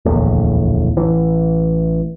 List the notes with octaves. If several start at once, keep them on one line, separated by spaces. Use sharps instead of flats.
D1 A#1 E2 A2
A1 E3